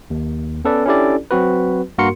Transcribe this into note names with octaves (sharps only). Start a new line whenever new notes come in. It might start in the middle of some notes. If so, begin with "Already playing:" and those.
D#2
B3 C#4 A4 B4 D5
C#4 D4 E4 G4 A4 D5
F#3 C4 F#4 B4
G2 A#3 F#4 A#4 C6 C#7